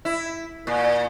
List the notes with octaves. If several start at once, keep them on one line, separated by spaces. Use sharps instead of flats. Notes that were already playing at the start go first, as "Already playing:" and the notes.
E4
A#2